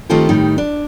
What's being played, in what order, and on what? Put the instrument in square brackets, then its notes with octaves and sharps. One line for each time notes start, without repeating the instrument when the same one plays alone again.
[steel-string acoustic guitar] D#3 A3 C4 F4 G4 A4
A2 D#3 G3 D#4
D4